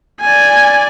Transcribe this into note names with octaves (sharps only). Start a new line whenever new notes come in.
D5 G#5